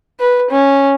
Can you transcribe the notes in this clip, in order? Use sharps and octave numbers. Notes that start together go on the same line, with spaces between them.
B4
C#4